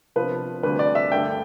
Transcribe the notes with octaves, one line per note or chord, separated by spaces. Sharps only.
C3 F3 B3 D4 B4
D2 D3 G3 C4 B4
D5
E5
G2 D3 A3 G5